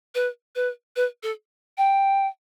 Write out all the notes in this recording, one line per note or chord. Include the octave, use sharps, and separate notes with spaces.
B4
B4
B4
A4
G5